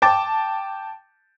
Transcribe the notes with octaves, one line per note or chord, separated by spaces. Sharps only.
G5 A5 D6 A6